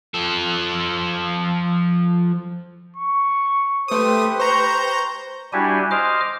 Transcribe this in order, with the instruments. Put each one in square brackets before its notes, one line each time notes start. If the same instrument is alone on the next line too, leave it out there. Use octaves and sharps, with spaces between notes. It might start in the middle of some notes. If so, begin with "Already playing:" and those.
[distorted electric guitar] F3 A4
[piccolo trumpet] C#6
[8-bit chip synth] A3 D#6 [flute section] G4 B4 [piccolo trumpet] C5
[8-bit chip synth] C5 A#5 G6 [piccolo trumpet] C#6
[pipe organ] G3 D4 E4 F#4 G4 G#5
C5 D#5 D6 F6